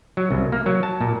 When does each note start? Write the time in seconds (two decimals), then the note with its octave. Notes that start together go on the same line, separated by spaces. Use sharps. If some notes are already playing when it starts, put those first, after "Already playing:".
0.17 F#3
0.31 C2
0.52 A#3
0.66 F#3
0.83 A5
1.01 A#2